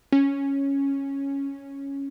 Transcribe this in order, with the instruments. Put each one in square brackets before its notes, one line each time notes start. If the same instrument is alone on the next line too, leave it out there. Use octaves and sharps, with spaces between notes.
[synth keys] C#4